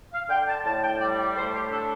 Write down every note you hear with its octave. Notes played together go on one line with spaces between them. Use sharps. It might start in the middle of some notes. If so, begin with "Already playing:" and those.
F5
D3 G5
A5
A2 A5
G5
G3 D5
D5
A2 C5
G4
D4 A4